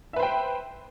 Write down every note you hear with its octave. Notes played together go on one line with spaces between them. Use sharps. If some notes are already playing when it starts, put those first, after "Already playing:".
B4 C5 E5 G5